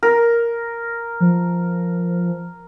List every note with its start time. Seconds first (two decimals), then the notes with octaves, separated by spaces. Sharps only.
0.03 A#4
1.20 F3